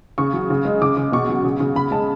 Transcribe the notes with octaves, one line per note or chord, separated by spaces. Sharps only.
C#3 C#6
F#3
C#3
G#3
C#3 D6
C#3
B2 C#6
F#3
C#3
C#3
C#3 B5
G#3 A5